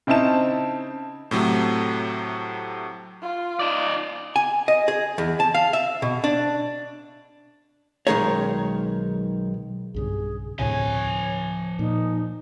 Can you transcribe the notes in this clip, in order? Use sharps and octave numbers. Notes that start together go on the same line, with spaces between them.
C#3 C4 D#4 E4 A5 E7
A2 C3 F#3 A3
F4
D#4 D5
G#5
D#5
G#4
E2
A5
F5
E5
B2
D4
B1 B2 D#3 G#3 A#4 C#5
B1 G2 C#3 G#4
D2 A2 C3 F3 C#5 G#5
A#2 D#4